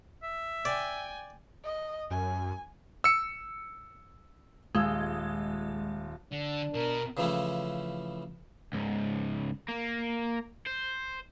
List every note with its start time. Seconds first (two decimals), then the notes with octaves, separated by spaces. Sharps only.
0.23 E5
0.65 D5 G5 G#5
1.64 D#5
2.10 F#2 G#5
3.04 E6 C#7
4.75 D#1 G#3 F4 E6
6.32 D3 D4
6.75 B2 A#4
7.17 C#3 E3 F3 A3 C#4 E4
8.73 C#2 G#2
9.68 A#3
10.67 C5